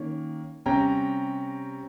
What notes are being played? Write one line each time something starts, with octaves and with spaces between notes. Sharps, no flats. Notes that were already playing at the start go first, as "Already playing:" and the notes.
Already playing: D#3 A#3 C#4
C3 G3 C#4 G5 A#5